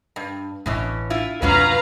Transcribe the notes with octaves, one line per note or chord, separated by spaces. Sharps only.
G2
A1 B2 E3 C#4
E4 F4
F2 B2 F#3 C#4 F4 B4 F5 A#5